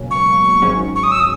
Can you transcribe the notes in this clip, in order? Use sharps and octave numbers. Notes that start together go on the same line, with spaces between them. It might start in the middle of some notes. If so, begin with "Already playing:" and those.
Already playing: C#2 B2 F#3 A#3 C#4
C#6
G#1 G#2 F#3 C#4
C#6
D#6
E6
D#6